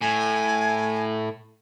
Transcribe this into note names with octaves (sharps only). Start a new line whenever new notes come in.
A2 G#5